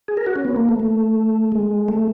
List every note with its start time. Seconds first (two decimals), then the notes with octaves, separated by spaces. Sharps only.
0.08 G#4
0.17 A#4
0.26 F#4
0.36 C#4
0.45 B3
0.56 A#3
0.69 A3
0.80 A3
1.52 G#3
1.88 A3